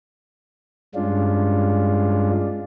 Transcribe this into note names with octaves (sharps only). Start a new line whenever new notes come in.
G2 G#3 C#4 D4 F4